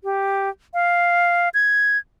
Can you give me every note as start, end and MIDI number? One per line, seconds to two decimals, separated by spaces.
0.04 0.49 67
0.74 1.49 77
1.54 1.98 92